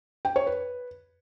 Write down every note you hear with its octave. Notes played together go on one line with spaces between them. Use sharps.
G5
C#5
B4